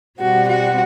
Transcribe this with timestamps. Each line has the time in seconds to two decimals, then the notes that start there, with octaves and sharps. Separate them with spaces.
0.20 B2 G3 C4 F#4
0.49 F#4